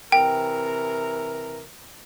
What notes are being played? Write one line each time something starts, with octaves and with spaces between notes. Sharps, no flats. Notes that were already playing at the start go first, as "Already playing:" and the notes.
C3 E3 A#4 G5